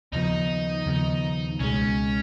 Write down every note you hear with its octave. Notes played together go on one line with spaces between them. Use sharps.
D#2 C#3 F3 B3 D#4
D#2 C#3 F3 B3
C#2 B2 G#3 C#4